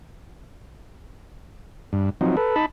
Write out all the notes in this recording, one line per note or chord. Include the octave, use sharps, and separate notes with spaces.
G2
F3 F#3 C4 D#4
A4 B4
D#4 A5 B5